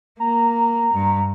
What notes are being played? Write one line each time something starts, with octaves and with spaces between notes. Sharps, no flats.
A#3 A#5
G2